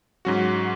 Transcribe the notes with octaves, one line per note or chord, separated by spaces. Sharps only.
G#2 F#3 C#4 F#4